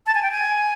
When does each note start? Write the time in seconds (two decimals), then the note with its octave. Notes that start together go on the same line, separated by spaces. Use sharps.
0.07 A5
0.15 G#5
0.23 G5
0.31 G#5